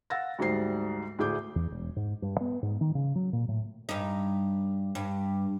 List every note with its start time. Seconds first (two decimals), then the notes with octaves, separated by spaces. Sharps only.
0.10 F5 F#5 E6 A6 A#6
0.38 D2 G#2 G3 C5 C7
1.19 D2 A2 G#4 D6 G6
1.56 E2
1.71 E1
1.96 G#2
2.22 G2
2.41 B3
2.63 G#2
2.81 D#3
2.95 C#3
3.15 F#3
3.33 A#2
3.48 A2
3.89 G2 D#4
4.95 G2